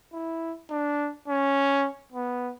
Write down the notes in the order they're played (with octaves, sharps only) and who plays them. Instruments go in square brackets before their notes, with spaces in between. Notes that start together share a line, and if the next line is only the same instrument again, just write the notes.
[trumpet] E4
D4
C#4
B3